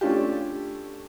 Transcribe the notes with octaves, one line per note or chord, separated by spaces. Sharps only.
A3 C#4 D4 F4 G4